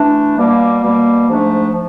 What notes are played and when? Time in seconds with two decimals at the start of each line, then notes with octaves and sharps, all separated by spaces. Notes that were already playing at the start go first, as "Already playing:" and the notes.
Already playing: E3 A3 D4
0.37 B2 G3 A#3
0.83 B2 G3 A#3
1.28 G#2 F3 A3 D4
1.74 F3